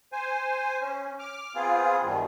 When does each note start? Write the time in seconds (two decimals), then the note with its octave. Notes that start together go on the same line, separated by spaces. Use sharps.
0.13 C5 G#5
0.82 C#4
1.19 D6 F6
1.55 B3 C4 F4 G#4
2.03 E2 G2 B2 D#3